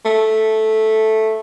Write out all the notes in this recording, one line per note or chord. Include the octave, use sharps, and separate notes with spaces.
A3